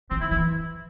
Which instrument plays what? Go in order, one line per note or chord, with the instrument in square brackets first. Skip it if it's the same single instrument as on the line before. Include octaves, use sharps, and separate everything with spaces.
[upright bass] D#3 [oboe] C4
[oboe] E4
[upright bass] E3 [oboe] E4